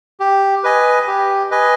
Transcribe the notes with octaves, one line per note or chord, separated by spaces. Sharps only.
G4
B4 D#5 G#5
G4
B4 D#5 G#5